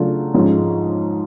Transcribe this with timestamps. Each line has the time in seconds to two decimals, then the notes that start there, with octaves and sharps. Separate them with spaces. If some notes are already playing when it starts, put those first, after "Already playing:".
Already playing: C#3 F#3 A3 D4 F4
0.34 G#2 F3 G#3 C#4